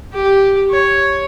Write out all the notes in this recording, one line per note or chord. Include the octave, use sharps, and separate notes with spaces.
G4
C#5